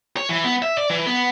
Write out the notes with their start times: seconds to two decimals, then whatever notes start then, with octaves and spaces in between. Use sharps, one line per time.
0.17 C#5
0.29 E3
0.44 B3
0.62 E5
0.78 D5
0.90 E3
1.07 B3